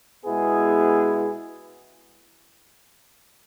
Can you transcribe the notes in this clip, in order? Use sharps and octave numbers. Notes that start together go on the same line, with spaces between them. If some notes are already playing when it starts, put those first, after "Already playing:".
B2 G#3 B3 E4 G#4